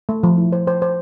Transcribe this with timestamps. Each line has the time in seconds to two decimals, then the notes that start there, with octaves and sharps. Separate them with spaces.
0.09 A3
0.23 F3
0.38 E4
0.52 C5
0.67 C5
0.82 C5